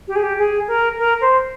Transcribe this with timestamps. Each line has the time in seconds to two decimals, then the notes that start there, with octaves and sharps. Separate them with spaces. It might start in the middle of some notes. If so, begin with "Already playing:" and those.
0.08 G4
0.16 G#4
0.23 G4
0.38 G#4
0.68 A#4
0.98 A#4
1.21 C5